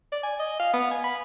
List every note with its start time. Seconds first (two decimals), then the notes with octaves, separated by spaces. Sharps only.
0.12 D5
0.24 G#5
0.40 D#5
0.59 F5
0.74 B3
0.91 G#5
1.04 B5